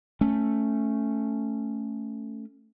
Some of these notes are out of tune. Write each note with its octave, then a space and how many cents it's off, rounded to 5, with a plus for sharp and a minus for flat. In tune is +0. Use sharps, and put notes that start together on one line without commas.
A3 +5 C#4 +0